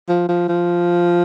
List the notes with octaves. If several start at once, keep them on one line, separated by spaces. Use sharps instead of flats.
F3
F3
F3